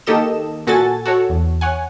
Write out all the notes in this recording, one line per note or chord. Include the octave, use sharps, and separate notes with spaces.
D#3 A#3 G4 A4 D#5 E7
A#2 F#4 A4 G#5 A6
F#4 A4 C#5
E2
C#5 F#5 G#5